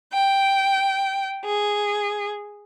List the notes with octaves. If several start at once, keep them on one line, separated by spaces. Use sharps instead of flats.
G5
G#4